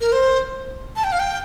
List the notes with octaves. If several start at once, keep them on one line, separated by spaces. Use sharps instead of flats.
A#4
C5
A5
G5
F5
G5